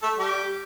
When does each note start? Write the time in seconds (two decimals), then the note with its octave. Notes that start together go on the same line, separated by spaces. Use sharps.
0.02 A3 A4
0.18 G3 G4